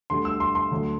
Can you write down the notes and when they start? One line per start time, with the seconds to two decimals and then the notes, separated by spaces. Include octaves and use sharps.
0.10 D2 D3 G3 C6
0.25 E6
0.40 C6
0.55 C6
0.71 D2 D3 F#3